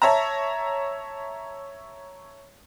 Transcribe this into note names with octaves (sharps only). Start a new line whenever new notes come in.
C#5 E5 A5 A#5